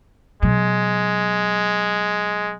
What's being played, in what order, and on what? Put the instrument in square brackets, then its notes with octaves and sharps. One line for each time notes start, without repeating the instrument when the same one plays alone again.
[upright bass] B2 F#3 [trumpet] G#3